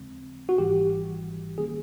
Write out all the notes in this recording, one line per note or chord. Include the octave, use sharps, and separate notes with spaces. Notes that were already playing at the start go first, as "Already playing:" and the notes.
Already playing: D#2 C#3 F3 G#3 C4
F#4
G#1 G#2 E3 G3 G4
D#3 G3 A#3 C#4 G#4